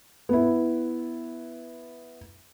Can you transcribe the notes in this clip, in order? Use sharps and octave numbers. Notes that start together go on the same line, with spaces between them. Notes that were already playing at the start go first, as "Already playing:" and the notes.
B3 E4